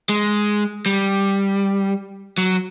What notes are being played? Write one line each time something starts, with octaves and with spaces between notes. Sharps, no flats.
G#3
G3
F#3